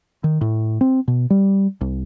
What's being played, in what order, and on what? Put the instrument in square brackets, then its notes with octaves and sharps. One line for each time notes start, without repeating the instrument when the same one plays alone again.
[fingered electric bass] D#3
A2
C4
B2
G3
C2